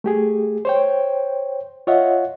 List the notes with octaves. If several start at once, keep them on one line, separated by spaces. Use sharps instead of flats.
A3 G4 G#4
C5 C#5 G5
F4 C#5 D#5 E5 F#5